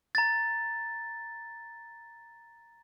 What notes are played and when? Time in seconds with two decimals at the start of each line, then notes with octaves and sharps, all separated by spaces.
0.15 A#5 A6